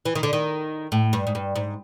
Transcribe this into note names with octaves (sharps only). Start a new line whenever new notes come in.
E3
D#3
D3
D#3
A2
G2
G#2
G2
G#2